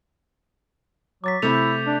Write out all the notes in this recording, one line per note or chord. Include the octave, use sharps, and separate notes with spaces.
F#3 D6 A6 B6
C3 A3 E4 D6 G6 F7
G6
D4